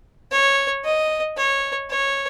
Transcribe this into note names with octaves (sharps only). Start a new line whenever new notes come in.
C#5
D#5
C#5
C#5